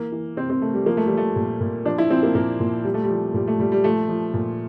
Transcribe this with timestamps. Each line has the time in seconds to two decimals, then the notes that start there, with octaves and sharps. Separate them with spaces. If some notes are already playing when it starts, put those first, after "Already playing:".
Already playing: E3 A#3
0.12 E3
0.36 C3 C4
0.50 C4
0.62 C3 A3
0.74 G3
0.86 F3 A#3
0.97 A3
1.06 G3
1.11 F3
1.17 A3
1.36 A#2
1.61 A#2
1.85 F3 D4
1.98 E4
2.10 F3 C4
2.23 A#3
2.35 A#2 A#3
2.60 A#2
2.84 F3 G3
2.94 A3
3.04 G3
3.10 F3
3.34 A#2 G3
3.47 A3
3.59 A#2 G3
3.72 G3
3.84 F3 A3
4.09 F3
4.34 A#2